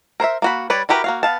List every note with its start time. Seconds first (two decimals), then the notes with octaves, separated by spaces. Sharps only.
0.20 A#4 C5 C#5 E5
0.42 A#3 F#4 B5
0.70 G3 B4 C#5 D5
0.89 E4 F#4 G4 A#4 B4
1.04 A#3 F#4 F5
1.23 B3 F5 A5